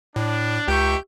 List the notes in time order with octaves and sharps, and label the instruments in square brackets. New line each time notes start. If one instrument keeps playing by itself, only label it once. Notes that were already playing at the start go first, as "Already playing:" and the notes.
[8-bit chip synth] A2 [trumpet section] D4
[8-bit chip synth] C#2 G6 [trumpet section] D#4 E5 C#6 [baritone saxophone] G4